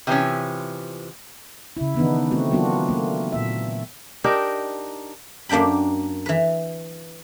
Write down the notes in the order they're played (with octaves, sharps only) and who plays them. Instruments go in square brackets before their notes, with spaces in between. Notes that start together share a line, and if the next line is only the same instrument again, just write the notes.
[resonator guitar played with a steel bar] C3 E3 F3 C#4
[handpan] C#3 E4
D#3 E3 B3 D4 D#4
A3 C4 F#4
F#3 A#3 B3 D4 F4 F#4
A3 A#3
A#2 E5
[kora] D4 D#4 G4 A#4
[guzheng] F#2 A#3 D4 G5 B5
E3 B4